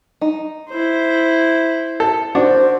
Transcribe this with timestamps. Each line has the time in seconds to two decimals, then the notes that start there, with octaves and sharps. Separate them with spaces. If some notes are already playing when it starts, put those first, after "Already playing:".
0.21 D#4
0.69 E4 C5
2.00 A4
2.35 D#3 D4 F#4 C5